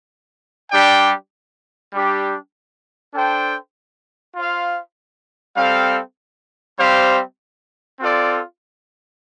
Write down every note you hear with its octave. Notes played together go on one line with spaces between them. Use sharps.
G3 D4 G4 D5 G5
G3 D4 G4
D4 A4 C5 G5
F4 C5 F5
G3 C4 A4 F5
G3 C4 G4 C5 F5
C4 F4 A4 D5